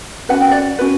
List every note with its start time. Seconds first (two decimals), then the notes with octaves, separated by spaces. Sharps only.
0.29 C#4 F#4 B4 F#5
0.41 G5
0.51 D5 F#5
0.79 C#4 F#4 B4